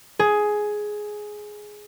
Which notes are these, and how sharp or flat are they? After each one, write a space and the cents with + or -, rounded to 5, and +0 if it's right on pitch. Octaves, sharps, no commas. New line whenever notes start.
G#4 +10